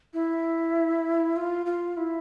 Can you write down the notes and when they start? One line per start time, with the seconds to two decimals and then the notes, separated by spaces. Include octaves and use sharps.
0.13 E4
1.36 F4
1.66 F4
1.97 E4